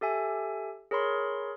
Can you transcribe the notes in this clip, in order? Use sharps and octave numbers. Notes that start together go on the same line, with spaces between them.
G4 A4 E5 G#5
G#4 A#4 C#5 B5 C6